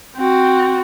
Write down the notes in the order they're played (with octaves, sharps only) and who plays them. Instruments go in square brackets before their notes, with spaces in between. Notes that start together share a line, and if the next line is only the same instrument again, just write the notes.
[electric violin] C4 F#4